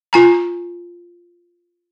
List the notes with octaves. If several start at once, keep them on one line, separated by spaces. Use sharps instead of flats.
F4 G#5 A#5